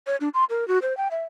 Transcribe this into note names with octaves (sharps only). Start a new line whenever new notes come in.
C#5
D4
C6
A#4
F#4
C5
G5
E5